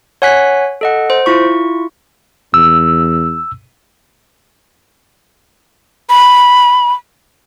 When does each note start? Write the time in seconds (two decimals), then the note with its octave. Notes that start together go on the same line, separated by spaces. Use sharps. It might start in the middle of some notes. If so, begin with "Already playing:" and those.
0.22 C#5 F#5 G#5 F#6 B6
0.81 A4 D#5 F#5
1.10 C5
1.26 E4 F4 C#6
2.54 E2 E6
6.09 B5